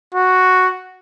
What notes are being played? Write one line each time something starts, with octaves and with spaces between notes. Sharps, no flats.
F#4